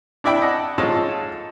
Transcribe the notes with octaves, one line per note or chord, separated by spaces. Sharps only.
D4 E4 D5 E5 G5 B5
D#5 F#5 A5
G#2 C#4 F4 A4 A5